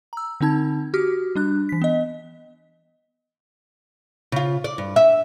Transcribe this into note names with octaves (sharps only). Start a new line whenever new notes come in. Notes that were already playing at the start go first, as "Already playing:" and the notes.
A#5 E6
D3 C4 D#4 A5 G#6
F#4 G4 F6
G3 D4 F#6
E3 B6
B3 D#5
C#3 F4
D5
G2
E5